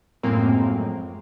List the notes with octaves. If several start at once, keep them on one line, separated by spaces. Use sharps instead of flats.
F#2 A2 F3 G#3 A#3 C4